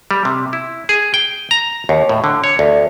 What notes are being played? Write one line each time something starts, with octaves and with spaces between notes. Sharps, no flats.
G3
C3
E4
G#4
G5
A#5
D#2
A2
D3
C#5
D2